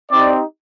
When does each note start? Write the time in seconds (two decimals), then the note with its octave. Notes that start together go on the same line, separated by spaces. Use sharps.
0.11 C4 D#4 G4 D5